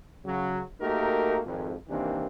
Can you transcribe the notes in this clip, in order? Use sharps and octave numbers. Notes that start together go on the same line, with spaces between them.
C#3 F#3
A3 A#3 D#4 F#4 G4 A#4
G#1 F2
C3 D#3 E3 A#3 C4 D4